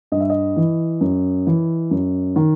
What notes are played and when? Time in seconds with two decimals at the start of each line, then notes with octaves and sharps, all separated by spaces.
0.12 G2 D#5
0.20 E5
0.30 D#5
0.57 E3
1.01 F#2
1.47 E3
1.91 F#2
2.36 D#3